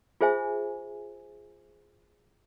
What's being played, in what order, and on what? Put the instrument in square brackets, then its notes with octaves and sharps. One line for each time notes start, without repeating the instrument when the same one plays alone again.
[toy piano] F4 G#4 C5 E5 G#5